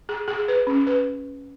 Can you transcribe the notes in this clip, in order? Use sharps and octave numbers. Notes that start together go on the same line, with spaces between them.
G#4
G#4
B4
C#4
B4